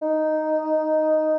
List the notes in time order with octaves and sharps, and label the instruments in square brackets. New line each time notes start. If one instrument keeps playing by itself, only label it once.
[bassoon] D#4